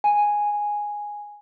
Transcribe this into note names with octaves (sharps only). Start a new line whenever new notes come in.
G#5